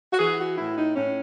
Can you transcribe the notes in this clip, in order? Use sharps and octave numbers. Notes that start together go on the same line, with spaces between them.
F#4
E3 G#4
F#4
A2 E4
D#4
A2 C#4